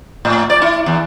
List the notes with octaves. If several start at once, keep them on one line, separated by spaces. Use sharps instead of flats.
A2
D5
E4
E2